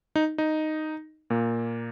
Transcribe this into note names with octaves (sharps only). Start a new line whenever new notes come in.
D#4
D#4
A#2 A#3